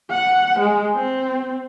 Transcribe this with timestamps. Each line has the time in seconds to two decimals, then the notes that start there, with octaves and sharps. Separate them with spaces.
0.10 F#5
0.59 G#3
0.95 C4